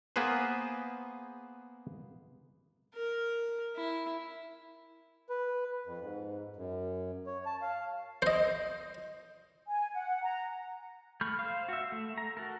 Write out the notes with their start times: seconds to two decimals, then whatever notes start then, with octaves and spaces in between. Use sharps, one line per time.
0.16 A#3 B3 G#4 B4 C5
2.95 A#4
3.76 E4
5.29 B4
5.86 F2
6.01 G#2
6.56 F#2
7.27 C#5
7.46 A5
7.62 F5
8.22 C5 D#5
9.67 G#5
9.93 F#5
10.23 A#5
11.21 A3 B5 C#6 F6 G6
11.39 C5 F5
11.69 F#4 E5
11.92 A3
12.18 A#5
12.37 F#4 A4 A#4